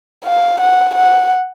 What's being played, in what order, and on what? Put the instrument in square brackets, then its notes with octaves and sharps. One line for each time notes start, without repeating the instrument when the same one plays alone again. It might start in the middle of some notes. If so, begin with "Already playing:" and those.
[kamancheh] F5
F#5
F#5